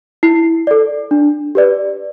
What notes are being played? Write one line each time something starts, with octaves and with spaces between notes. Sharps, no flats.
E4 C7
A4 D5
D4
G4 B4 D5